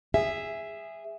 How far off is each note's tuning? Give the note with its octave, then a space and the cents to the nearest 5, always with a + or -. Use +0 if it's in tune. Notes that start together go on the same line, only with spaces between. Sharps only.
G#4 -15 E5 +5